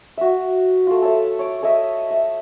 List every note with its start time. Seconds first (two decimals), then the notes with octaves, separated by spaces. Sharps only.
0.17 F#4 E5
0.87 A3 F4
1.02 A4 C#5 E5
1.39 C#5 D6
1.62 A4 C#5 D#5 E5
2.10 E5